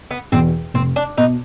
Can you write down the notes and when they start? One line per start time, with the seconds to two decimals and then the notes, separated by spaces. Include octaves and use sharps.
0.11 B3
0.32 E2 B2 C4
0.74 F1 C4
0.96 D4
1.18 B2 D#4